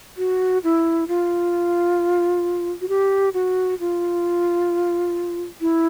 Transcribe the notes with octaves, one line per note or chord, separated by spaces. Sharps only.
F#4
E4
F4
F#4
G4
F#4
F4
E4